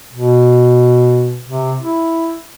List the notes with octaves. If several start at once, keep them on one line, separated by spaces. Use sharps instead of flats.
B2
C3
E4